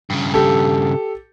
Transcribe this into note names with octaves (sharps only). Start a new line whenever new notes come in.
G2 C#3
G4 A4